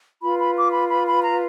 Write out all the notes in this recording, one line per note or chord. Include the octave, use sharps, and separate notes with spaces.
F4 B4 B5
B5
D6
B5
B5
B5
A#5